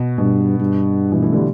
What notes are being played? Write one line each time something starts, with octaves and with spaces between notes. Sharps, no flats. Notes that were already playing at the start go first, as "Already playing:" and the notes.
Already playing: B2
G2 B2
G2
B2 E3
E3 A3
D3 G3